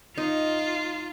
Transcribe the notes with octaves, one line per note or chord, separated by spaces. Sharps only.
D#4 F4